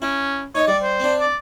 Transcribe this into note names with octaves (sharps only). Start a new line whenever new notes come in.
C#4 E4
D#4 C#5 D#5
G3 D5
C5
C4 D4
D5